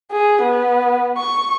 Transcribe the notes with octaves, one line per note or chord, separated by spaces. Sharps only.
G#4
B3
C#6